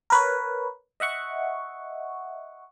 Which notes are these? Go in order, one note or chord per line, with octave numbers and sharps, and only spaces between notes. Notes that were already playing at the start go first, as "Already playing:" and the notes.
A#4 B4 C#5
D#5 E5 F#5 C#6